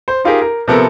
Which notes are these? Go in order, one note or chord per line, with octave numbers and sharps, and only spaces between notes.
C5
D#4 F4 G4 G#4 A#4
A#4
C3 F3 B3 A4 A#4